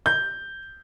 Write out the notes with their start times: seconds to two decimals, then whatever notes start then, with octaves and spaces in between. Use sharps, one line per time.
0.06 G6